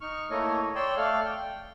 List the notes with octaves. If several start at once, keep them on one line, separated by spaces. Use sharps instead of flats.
D#4 C#6 F6
A3 A#3 E4 A4 C#5 D#5
C#5 D5 G5 C6 E6
A3 A4 D5 F5 F6
G5